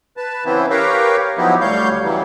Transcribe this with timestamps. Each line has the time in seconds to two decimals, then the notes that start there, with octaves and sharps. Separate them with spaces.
0.17 B4 A5
0.45 C#3 E3 B3 C4 E4
0.70 G4 A#4 B4 C#5 F5 G5
1.38 F3 F#3 B3 D#4 E4 G4
1.61 D2 G3 C#5 F5 G6
2.03 C#3 E3 F#3 G3